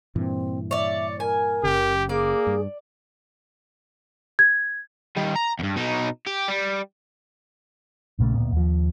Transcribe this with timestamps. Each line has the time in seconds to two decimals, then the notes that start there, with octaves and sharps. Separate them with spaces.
0.16 G2 A#2 E3 C4
0.71 C#5 D5 E5
1.20 A#4 G#5
1.63 F#1 C#3 G4
2.09 A#3 G#4 D5
2.47 G2
4.39 G#6
5.17 D#3 G3
5.36 A#5
5.59 E2 G2
5.76 B2 D#4
6.26 G4
6.48 G3
8.19 A#1 A#2 C#3 A3
8.34 D1 A#1 A#2 B3
8.52 D#2 F3